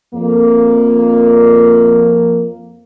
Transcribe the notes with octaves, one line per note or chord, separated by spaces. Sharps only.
F2 A#3